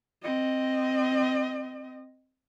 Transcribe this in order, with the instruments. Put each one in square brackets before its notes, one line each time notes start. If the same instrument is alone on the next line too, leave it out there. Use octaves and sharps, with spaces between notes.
[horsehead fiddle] C4 D#5